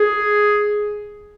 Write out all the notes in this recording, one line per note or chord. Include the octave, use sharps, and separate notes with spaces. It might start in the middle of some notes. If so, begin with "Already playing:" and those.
Already playing: G#4